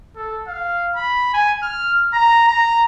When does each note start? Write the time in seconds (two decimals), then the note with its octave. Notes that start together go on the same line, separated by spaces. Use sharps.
0.16 A4
0.47 F5
0.95 B5
1.33 G#5
1.62 F6
2.13 A#5
2.48 A#5